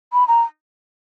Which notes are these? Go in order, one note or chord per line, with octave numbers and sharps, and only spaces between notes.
B5
A#5